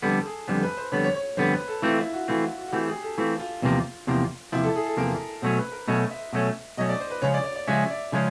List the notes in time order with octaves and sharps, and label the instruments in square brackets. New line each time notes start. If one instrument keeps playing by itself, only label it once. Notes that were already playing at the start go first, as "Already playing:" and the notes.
[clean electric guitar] F2 D3 G3 B3 [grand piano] A4
[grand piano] G#4
[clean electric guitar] F2 D3 G3 B3 [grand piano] C5
[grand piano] B4
C5
[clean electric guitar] F2 D3 G3 B3 [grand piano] C#5
[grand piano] C#5
C#5
[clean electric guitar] F2 D3 G3 B3 [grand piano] C5
[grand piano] B4
A4
[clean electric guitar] E3 A3 C4 [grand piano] F4
[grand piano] E4
F#4
[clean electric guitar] E3 A3 C4 [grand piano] F4
[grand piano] F#4
F#4
F#4
[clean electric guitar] E3 A3 C4 [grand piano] G4
[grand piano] G#4
A4
[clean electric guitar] E3 A3 C4 [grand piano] F4
[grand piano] F4
[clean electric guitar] E2 C3 F3 A#3
E2 C3 F3 A#3
[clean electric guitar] E2 C3 F3 A#3 [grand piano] E4
[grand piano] A4
G#4
A4
[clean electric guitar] E2 C3 F3 A#3 [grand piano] A#4
[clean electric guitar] B2 F#3 A3 C#4 [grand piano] C5
[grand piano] B4
A#4
[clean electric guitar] B2 F#3 A3 C#4 [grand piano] D#5
[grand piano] E5
[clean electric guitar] B2 F#3 A3 C#4
[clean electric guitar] B2 F#3 A3 C#4 [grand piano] D#5
[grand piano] D5
C5
B4
[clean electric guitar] C#3 F3 G#3 C#4 [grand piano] C#5
[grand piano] D5
D5
D5
[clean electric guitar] C#3 F3 G#3 C#4 [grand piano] E5
[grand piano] D5
[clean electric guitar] C#3 F3 G#3 C#4